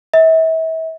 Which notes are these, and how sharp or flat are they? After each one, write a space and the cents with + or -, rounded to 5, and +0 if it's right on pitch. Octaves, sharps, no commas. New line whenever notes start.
E5 -35